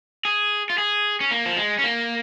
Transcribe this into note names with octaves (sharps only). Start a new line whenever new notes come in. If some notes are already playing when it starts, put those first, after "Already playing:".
G#4
F4
G#4
C#4
A#3
F3
G#3
C#4
A#3